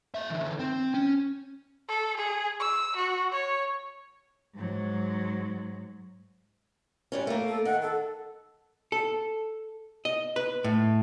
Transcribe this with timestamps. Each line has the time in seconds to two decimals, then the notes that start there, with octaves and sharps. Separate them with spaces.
0.15 A#3 E5
0.30 D3 E3
0.59 C4
0.94 C#4
1.89 A4
2.17 G#4
2.60 E6
2.97 F#4
3.32 C#5
4.55 G#2 F#3
7.12 G#2 G3 C#4
7.27 A3 A#3
7.48 A4
7.65 D#3 F#5
7.82 A4
8.92 A4
10.05 D#5
10.36 B4
10.64 A2